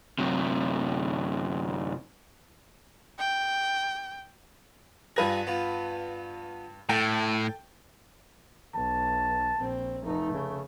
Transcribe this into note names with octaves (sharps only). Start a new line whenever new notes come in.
F#2 C3
G5
G2 G3 F4 G#4 B4 A#6
B3 F4
A2 A4 G5
B1 A5
A#1 C4
F1 A3 D#4
C#3